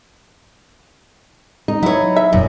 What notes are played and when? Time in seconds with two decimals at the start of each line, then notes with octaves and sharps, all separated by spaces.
1.68 D#4
1.83 F#3 E4 C#5
2.16 E5
2.33 D#1 F#2 A#2